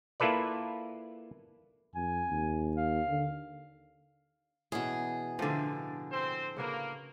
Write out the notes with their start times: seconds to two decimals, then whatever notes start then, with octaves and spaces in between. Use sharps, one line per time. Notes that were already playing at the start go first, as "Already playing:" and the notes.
0.20 A#3 E4 F4 A4 B4 D5
1.95 F2 G#5
2.30 D#2
2.76 F5
3.09 D3
4.72 B2 E3 C#4 G#4
5.39 A2 D3 F3 A3 F4
6.10 C4 C5
6.57 C#3 A#3 F#4 B4